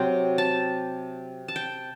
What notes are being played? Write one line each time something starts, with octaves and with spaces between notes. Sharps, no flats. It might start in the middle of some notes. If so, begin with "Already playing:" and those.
Already playing: C3 F#3 C4 G5
A5
A5
G5